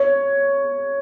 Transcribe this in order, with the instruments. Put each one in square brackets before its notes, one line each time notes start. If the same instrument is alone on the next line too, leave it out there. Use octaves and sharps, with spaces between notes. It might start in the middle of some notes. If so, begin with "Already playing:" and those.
Already playing: [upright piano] C#5